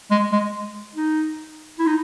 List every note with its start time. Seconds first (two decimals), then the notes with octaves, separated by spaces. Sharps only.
0.11 G#3
0.32 G#3
0.95 D#4
1.79 E4
1.87 D#4